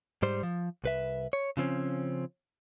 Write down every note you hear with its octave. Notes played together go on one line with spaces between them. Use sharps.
G#2 G3 C5
F3
C2 B4 E5
C#5
C#3 F3 C4 C#4